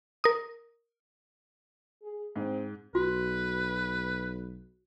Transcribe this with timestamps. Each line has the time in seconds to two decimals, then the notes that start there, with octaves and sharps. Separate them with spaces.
0.24 A#4 D#6
2.02 G#4
2.36 G#2 C4
2.95 B1 F#4 B4